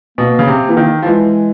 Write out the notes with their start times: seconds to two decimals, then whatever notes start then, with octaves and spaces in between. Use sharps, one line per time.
0.18 B2 A#3
0.39 C#3
0.47 C3
0.62 A#3
0.69 E3
0.77 D#3
1.02 F3
1.06 E3 G#3